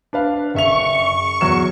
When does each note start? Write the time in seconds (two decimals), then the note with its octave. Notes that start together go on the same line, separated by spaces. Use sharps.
0.13 D4 B4 F5
0.54 F#1 E5 C#6 F7
1.41 E2 F#3 E7